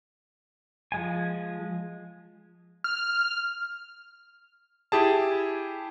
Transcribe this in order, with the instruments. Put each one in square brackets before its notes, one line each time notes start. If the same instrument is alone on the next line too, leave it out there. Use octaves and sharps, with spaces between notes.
[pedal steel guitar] F3 G#3 G#5
[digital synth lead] F6
[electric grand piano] E4 G4 G#4 A5